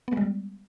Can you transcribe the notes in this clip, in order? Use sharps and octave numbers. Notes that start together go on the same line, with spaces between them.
G3 G#3 B3